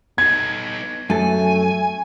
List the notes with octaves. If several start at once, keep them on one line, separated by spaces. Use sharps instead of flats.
B3 D#4 G#6
F#2 A3 A4 G#5